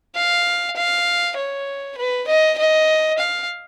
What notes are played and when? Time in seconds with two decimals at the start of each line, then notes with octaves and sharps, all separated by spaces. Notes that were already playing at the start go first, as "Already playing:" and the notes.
0.16 F5
0.77 F5
1.37 C#5
1.98 B4
2.28 D#5
2.58 D#5
3.19 F5